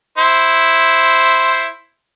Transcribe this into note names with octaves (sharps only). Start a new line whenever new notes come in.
E4 C5